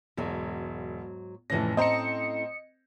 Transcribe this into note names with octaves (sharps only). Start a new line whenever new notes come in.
E1 G#2 F#3
F1 A2 E3 C#4 A#6
C4 C5 D#5 A#5 C#7